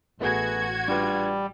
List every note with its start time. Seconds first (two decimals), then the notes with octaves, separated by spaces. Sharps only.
0.20 A1 A3 B3 F#4 G#4 G#6
0.88 G3 D4 F4 B4